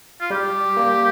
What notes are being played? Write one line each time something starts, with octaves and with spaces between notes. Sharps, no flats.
F4
G3 G4
A#3